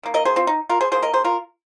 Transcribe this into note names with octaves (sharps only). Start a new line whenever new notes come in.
D#3 A#3
A#4 D#5
G#4 C5
C4 F4
D#4
F4 A#4
G#4 C5
D#3 A#3 G#4 C5
A#4 D#5
G#4 C5
F4 A#4